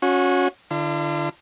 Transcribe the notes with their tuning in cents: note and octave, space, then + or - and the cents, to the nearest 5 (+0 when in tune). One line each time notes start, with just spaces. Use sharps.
C#4 +0 F#4 -30
D3 +25 F4 -40